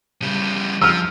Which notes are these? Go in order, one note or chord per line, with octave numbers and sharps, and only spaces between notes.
C#3 G3
F3 E6 F6